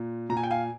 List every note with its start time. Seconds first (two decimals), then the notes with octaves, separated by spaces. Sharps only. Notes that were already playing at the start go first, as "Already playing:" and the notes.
Already playing: A#2
0.30 A#2 A#5
0.37 G#5
0.44 G5
0.51 F5 G#5